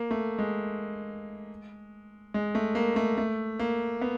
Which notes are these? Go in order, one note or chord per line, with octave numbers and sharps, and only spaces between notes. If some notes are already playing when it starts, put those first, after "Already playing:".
Already playing: A#3
A3
G#3
G#3
A3
A#3
A3
A3
A#3
B3